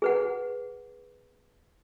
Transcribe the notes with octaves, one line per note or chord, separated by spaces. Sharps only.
G#4 B4 F#5